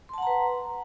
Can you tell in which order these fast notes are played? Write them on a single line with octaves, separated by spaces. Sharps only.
C6 A5 F#5 A#5 B4